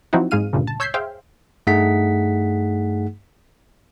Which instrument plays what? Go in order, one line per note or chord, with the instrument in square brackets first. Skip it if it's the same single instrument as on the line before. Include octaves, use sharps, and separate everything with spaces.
[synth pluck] F3 F#3 C4 D#4 E4 F#4
G#2 G#3 G#4 F5 F6 D#7
D2 G2 A#2 C#3
A5
C#5 E6 G6 G#6 B6 C7
G#4 C5 E5 F5 G5
[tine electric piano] G2 A3 D#4 G#4 F#5 B6